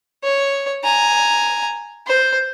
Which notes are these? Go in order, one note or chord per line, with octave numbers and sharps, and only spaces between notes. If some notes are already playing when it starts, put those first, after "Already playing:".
C#5
G#5 A#5
C5